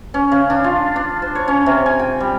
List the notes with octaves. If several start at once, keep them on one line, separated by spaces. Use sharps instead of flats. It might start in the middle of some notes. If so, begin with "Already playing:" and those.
C#4
C#3
D4
F4
D4
C5
C#5
C#4
C3
G#5
G5
G3